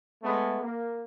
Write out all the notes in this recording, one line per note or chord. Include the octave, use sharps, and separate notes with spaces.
G#3 A3 B3
A#3